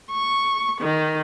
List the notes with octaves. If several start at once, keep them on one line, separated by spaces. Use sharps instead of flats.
C#6
D#3